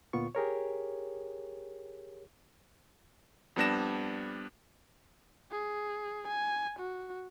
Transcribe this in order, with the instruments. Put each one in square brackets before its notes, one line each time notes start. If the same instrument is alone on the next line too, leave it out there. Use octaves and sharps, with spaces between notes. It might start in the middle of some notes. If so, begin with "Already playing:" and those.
[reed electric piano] D2 A#2 B3 F4 C#6
G4 G#4 A#4 C#5
[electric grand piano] F2 G3 B3 D4 A#6 E7
[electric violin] G#4
G#5
F#4